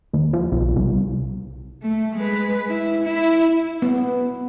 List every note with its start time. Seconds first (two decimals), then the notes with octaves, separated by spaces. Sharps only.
0.13 D#2
0.33 F3
0.52 B1
0.76 C2
1.82 A3
2.15 G#3 B4
2.68 E4
3.04 E4
3.82 B3